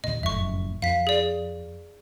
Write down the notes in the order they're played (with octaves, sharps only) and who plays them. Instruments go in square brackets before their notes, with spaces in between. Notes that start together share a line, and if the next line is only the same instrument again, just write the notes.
[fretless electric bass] D#2 A#2 [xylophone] D#5
[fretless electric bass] F#1 F2 A2 [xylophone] E5 C#6
[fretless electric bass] F2 [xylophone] F5 B6
[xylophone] G#4 D5